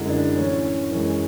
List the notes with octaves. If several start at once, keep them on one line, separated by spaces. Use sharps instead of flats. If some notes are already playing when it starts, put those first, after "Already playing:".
Already playing: F#2 D3 G#3 E4
D4
A2 E3 A3 C#4
F#2 E3 G#3